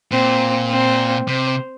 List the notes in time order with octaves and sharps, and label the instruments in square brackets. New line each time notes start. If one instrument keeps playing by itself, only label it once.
[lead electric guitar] A#2 [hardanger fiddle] C4
[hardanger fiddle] C4
[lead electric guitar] C3 [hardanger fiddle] C5